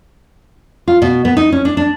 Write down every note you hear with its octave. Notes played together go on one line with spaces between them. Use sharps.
F4
B2
B3
D#4
C#4
D4
D4